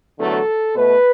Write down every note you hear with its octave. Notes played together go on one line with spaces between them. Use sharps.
E2 D3 F#3 A3 A4
B2 A3 B4